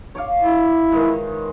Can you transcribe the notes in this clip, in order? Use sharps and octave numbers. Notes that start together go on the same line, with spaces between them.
C#5 D5 F5
E4
D#3 E3 G#3